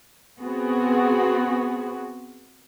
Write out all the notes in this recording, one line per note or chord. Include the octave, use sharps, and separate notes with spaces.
B3 C4 F#4 G#4